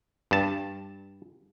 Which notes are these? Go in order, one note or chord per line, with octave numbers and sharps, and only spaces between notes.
G2 A5